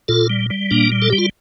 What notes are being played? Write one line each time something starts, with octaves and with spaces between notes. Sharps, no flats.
A#2 F4 A4
G3
G3
A#2 A#3 D4
G3
A4
G3 G4
F4